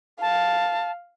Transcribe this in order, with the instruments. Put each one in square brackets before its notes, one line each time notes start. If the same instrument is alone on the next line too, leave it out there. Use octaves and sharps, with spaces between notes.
[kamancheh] F5 [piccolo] A5